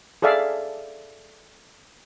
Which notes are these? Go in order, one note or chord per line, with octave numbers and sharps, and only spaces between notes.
G#4 A4 D5 E5 F5